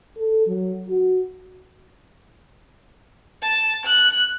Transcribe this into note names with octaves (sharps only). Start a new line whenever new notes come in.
A4
F#3
F#4
A5
F#6